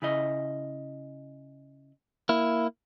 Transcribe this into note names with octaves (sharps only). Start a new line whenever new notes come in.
C#3 E4 D#5
A#3 E4